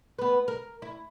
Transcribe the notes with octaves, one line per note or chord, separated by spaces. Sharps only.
B3 B4
A#4
E4